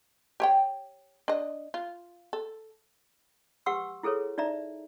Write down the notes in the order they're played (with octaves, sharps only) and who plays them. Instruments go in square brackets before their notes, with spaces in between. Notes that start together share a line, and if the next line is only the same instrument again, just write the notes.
[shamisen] G4 C#5 G5
D4 D#5
F4
A4
[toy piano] G4 B4 F#5 C6 C#6 E6
E4 G#4 A4 B4 C#5
D#4 D5 E5 A#5